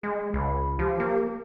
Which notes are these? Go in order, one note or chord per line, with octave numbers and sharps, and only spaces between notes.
G#3 G#4
C#2 B5
F3 G4
A#3